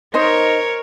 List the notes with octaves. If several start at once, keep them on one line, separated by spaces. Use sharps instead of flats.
D#4 A#4 C5 C#5 D#5